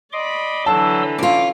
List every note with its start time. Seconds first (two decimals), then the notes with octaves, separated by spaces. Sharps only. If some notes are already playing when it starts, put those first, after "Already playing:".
0.13 D5 D#5 B5 C6 D6
0.66 D3 E3 F#3 A5 C6 E6
1.18 C#4 F4 D6